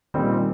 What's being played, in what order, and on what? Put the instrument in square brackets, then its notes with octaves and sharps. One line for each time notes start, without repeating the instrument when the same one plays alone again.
[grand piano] A#2 G3 C4 D#4 [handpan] D#3